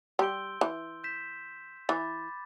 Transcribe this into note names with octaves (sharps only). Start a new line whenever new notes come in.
G3 C6 E6 G6 D7 G7
E3
G6 B6 E7
E3 B5 D6 A6